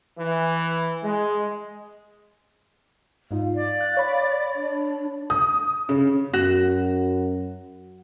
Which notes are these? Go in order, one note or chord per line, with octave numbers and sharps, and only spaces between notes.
E3
G#3
G#2 D#4 F4 F5
D5
F#6
C#5 B5
D4
D#6
C#3
F#2 F#4